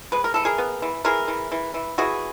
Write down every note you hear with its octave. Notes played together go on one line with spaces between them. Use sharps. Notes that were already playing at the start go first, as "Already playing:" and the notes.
G#3 B4
A#4
E3 A4
G#4 A#4
B3
E3
E3 G#4 A#4
E3
E3
E3
E3 F#4 G#4